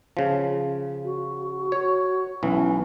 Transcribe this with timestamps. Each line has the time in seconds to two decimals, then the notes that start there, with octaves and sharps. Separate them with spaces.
0.17 C#3 F3
1.04 F#4
1.72 F#4 C#5
2.43 B1 E3 C#4